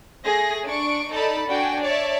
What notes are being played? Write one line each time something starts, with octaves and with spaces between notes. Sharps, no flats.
A3 G#4 A#6
D4 C#6 D7
D#4 A4 D5 A5 B5
D4 F#4 G5 G#5
C#5 D5 E5 A5